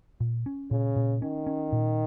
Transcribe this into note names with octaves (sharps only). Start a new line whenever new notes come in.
A#2
C#4
A#2 C#3
A#2
D#3 C#4
C#4
A#2